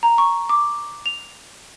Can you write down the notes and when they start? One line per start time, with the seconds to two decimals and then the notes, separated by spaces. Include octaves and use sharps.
0.03 A#5
0.18 C#6
0.49 D6
1.06 F7